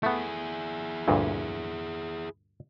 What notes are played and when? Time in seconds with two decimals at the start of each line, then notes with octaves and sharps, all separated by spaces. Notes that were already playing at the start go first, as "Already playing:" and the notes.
0.03 A3 B3 E4 G#4
1.08 D2 G2 A#2